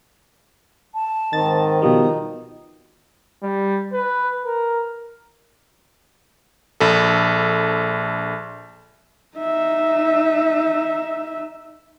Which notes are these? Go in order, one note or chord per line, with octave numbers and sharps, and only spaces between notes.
A5
G#2 D#3 C4 D#5 A6
B2 F3 G3 D#4 D#6
G3
B4
A#4
A#1 A4
D#4 E5